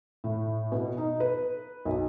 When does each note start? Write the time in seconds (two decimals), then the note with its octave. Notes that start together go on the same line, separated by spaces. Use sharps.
0.24 A2
0.72 B2
0.98 D#4
1.20 B4
1.85 B1